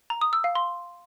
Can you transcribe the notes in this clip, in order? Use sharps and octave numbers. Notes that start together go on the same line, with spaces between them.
A#5
D#6
E6
F5
C6